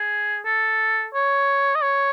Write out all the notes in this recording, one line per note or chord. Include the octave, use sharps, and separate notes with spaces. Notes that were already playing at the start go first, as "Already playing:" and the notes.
Already playing: G#4
A4
C#5
D#5
C#5